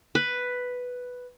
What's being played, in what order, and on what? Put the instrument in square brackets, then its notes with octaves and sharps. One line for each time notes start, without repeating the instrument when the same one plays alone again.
[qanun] B4